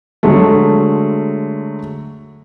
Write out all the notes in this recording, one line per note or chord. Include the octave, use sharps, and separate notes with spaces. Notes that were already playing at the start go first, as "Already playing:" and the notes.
D3 F#3 G#3 A3